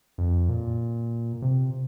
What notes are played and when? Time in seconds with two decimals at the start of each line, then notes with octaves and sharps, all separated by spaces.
0.18 F2
0.49 A#2
1.42 C3